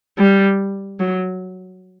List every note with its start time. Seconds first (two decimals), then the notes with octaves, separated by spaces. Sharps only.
0.19 G3
1.00 F#3